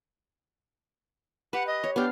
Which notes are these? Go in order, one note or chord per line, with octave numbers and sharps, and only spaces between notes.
G4 B4 F#5
D#5
C#5
B3 D4 G4 F5